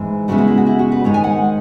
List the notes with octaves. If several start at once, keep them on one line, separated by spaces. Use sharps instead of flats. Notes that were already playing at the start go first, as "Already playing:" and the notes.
Already playing: G#2 E3 G#3
C#3 G#3 B3 E4 F#4
F#4
E4
F#4
E4
F#4
B4
G#2 D#3 G#3 D#4 C#5
G#5
F#5